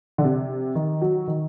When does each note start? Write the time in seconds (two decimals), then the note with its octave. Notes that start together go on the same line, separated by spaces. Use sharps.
0.18 D3
0.24 C3
0.75 D#3
1.02 F#3
1.28 D#3